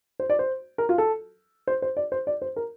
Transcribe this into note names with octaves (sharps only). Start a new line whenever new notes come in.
C5
D5
C5
A#4
F4
A4
C5
C5
D5
C5
D5
C5
A#4